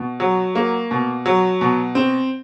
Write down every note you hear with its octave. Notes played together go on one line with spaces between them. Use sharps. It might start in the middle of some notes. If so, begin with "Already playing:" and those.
Already playing: B2
F#3
A#3
B2
F#3
B2
C4